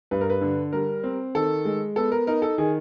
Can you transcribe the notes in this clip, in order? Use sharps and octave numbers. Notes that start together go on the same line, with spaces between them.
G2 B4
A#4
B4
D3
G3 A#4
C4
D#3 A4
G#3
B3 A4
A#4
D#4 A#4
A4
D#3 G#4